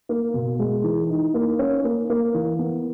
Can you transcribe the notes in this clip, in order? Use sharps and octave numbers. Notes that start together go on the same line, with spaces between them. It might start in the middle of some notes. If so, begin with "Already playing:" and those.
A#3
B2
G#3
E3
D#4
A#3
C#4
A#3
A#3
E3
B3